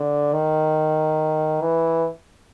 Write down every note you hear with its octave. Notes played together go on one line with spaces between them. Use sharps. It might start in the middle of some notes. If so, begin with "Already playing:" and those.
Already playing: D3
D#3
E3